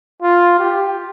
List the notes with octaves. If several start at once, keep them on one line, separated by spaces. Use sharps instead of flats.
F4
G4